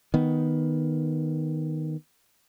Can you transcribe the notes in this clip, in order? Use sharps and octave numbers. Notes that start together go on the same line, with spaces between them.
D#3 B3